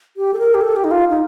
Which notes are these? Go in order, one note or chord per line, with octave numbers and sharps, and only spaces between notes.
G4
A4
A#4
G4
A4
G4
D#4
F4
D#4